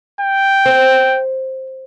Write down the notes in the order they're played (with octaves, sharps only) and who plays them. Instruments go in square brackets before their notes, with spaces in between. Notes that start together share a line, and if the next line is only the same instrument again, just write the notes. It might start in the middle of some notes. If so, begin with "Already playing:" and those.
[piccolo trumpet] G5
[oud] C5